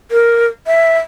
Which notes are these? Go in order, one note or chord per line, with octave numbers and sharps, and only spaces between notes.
A#4
E5